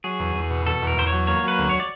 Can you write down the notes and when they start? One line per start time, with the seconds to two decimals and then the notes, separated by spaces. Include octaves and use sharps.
0.04 F#3 G#4
0.19 E2
0.35 E2
0.50 B2
0.66 B2 A4
0.82 E2 A#4
0.97 E2 C5
1.07 C#5
1.12 F#3
1.27 A#3 C#5
1.43 F#3 B4
1.58 D2
1.69 C#5
1.80 D5